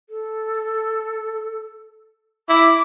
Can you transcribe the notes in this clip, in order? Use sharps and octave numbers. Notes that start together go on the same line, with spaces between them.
A4
E4 D6